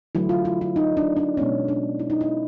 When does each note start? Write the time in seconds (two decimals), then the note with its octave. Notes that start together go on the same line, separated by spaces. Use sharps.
0.15 D3 F#3 A3 E4
0.29 F4
0.45 E4
0.61 E4
0.76 D#4
0.97 D4
1.17 D4
1.37 B2 G#3 B3 C#4
1.68 D4
1.99 E4
2.10 D#4
2.21 E4